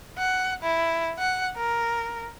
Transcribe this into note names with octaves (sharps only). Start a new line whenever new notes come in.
F#5
E4
F#5
A#4